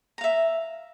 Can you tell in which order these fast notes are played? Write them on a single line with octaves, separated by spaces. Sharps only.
A#5 F5 E5